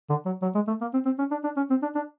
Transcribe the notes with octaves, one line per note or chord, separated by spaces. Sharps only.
D3
F#3
F#3
G#3
A3
A#3
C4
C4
C#4
D4
D4
C#4
C4
D4
D4